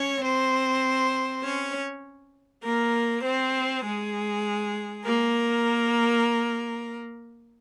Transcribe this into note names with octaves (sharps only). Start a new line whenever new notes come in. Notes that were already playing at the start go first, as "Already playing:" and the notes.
Already playing: C#4 C#5
C4 C5
C#4 C#5
A#3 A#4
C4 C5
G#3 G#4
A#3 A#4